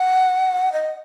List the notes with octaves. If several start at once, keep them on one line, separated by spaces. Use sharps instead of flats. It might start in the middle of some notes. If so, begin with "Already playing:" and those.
Already playing: F#5
D#5